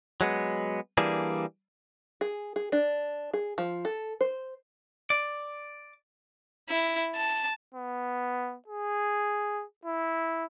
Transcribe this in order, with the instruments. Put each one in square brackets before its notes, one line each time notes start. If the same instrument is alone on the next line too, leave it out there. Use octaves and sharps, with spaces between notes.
[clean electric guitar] F#3 G#3 B3
E3 G3 A#3 D4 G#4
[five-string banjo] G#4
G#4
D4
G#4
F3
A4
C5
[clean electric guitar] D5
[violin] E4
A5
[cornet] B3
G#4
E4